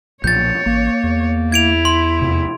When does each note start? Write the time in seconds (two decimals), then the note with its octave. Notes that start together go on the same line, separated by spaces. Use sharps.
0.24 B1 A#2 F3 C#5 G6 A6
0.66 A1 A#3
1.03 E2
1.52 E4 G#6 D7 F7
1.85 C6
2.22 F2 C3